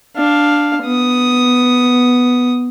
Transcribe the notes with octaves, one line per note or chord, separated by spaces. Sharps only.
D4 F5
B3 D#6